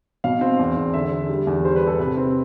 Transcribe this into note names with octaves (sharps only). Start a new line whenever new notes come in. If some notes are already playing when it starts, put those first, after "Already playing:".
B2 F5
C4
E2
E2
D3 E5
D3
G3
E2
G3 C5
B4
G3
A4
C3 B4
C4